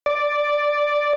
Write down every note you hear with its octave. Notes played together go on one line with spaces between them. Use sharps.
D5